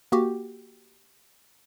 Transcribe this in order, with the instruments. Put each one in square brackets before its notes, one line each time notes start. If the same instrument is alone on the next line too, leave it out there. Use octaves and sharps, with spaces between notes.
[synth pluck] A#3 F#4 G4